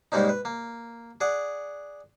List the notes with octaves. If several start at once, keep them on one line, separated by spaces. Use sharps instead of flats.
G#2 G3 G#3 A#3 C#4 D#4
B4
A#3
G#4 D5 F#5